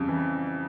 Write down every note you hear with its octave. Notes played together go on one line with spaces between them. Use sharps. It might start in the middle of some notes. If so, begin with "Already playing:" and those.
Already playing: F2 C#3 G3
E3